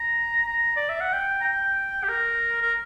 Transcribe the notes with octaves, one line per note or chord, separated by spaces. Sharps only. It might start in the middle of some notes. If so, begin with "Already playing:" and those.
Already playing: A#5
A#5
D5
E5
F#5
G5
A#5
G5
G4
A#4
A#4